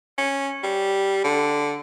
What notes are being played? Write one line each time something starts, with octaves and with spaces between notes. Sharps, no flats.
C#4
G3
D3